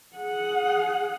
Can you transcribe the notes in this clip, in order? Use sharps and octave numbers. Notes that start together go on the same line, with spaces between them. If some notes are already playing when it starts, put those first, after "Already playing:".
G#4 F#5